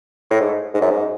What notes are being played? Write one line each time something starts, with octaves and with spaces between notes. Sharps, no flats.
A2
G#2
G#2
F#2
G#2